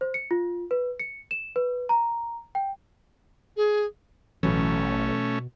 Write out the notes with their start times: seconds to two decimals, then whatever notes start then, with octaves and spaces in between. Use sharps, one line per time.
0.01 C5
0.14 C#7
0.31 F4
0.71 B4
1.00 C#7
1.31 E7
1.56 B4
1.89 A#5
2.55 G5
3.57 G#4
4.43 A1 B2 E3 F#3 A3 C#4